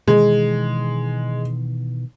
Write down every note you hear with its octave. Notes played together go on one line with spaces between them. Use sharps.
B2 D#3 E3 G#3